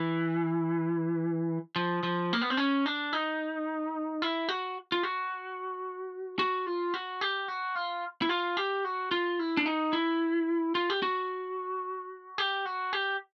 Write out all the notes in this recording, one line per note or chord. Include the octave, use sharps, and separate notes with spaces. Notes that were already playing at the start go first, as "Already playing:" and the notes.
Already playing: E3
F3
F3
A#3
B3
C4
C#4
D4
D#4
E4
F#4
F4
F#4
F#4
F4
F#4
G4
F#4
F4
E4
F4
G4
F#4
F4
E4
D4
D#4
E4
F4
G4
F#4
G4
F#4
G4